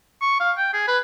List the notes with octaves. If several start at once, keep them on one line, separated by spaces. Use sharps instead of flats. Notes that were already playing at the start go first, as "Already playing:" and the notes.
C#6
F5
G5
G#4
B4